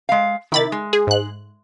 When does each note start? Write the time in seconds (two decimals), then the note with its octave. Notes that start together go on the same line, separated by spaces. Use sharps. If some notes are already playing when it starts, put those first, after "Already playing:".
0.09 G#3 F5
0.52 C3 D#3 E4 B5 A6
0.72 G#3
0.93 G#4
1.07 G#2 F#6